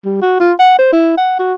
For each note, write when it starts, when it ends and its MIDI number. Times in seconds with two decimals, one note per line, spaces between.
0.05 0.19 55
0.22 0.36 66
0.40 0.52 65
0.59 0.75 78
0.79 0.88 72
0.93 1.17 64
1.18 1.36 78
1.39 1.54 66